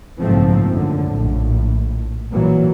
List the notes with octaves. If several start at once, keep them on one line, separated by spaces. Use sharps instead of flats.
F#1 B1 G#2 F3 A3 C4
F#2 D3
A#1 A2
A#2 E3 F#3